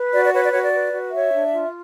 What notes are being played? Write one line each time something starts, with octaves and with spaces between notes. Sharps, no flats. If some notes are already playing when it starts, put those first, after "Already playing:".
Already playing: B4
F#4 D5
D5
B4 C#5
D5
F#4 C#5
D5
B4
F#4
C#5 E5
D4
F4